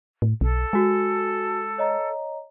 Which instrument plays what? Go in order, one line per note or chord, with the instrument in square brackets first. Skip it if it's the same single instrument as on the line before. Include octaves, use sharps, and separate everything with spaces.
[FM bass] A2
[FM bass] B1 [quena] A4
[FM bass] G#3 [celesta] F#4 G#5
[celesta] C#5 D#5 A#5